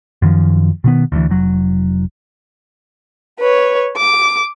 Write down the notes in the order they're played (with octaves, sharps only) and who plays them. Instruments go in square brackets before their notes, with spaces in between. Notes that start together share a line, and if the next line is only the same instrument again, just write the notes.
[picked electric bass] F#2 D#3 F3
B2 D#3 B3
D2 E3
F1 F#3
[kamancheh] B4 C#5
D6